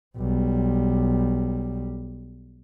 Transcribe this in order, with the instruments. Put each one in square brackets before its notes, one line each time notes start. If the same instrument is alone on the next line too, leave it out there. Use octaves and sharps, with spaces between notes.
[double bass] B1 G3